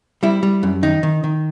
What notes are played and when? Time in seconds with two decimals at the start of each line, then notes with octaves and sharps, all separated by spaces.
0.23 G3 E4
0.43 G3
0.63 F#2
0.83 D#3 D#4
1.03 D#3
1.24 D#3